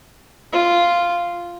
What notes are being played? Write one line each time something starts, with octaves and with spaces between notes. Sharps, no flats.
F4